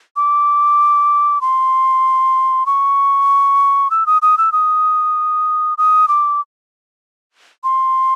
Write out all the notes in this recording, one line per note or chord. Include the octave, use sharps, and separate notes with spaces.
D6
C6
C#6
E6
D#6
D#6
E6
D#6
D#6
D6
C6